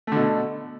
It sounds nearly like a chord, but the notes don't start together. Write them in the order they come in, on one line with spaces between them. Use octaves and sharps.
A3 D3 B2